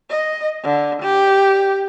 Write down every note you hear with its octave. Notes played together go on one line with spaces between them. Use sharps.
D#5
D3
G4